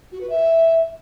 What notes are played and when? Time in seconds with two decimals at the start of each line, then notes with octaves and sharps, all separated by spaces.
0.12 F#4
0.21 B4
0.30 E5